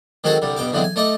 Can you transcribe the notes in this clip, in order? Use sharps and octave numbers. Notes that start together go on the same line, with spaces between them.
D#3 G#3 C4 F#4 G#4 A4
C2 D3 G3
G2 B2 G5 D6
E2 D3 E3 F#3 G#3 C4
G#5
A3 D#4 D5 D#5